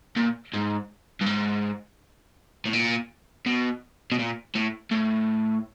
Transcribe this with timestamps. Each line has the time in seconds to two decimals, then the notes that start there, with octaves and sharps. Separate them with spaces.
0.16 A#2
0.54 G#2
1.21 G2
1.26 G#2
2.65 A2
2.73 A#2
3.46 B2
4.12 B2
4.19 A#2
4.56 A2
4.92 A2